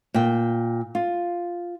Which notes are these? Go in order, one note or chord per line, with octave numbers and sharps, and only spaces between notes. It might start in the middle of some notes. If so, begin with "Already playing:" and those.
A#2 G5
F4